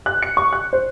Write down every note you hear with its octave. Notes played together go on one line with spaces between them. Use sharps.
F#6
C#7
C#6
F#6
C5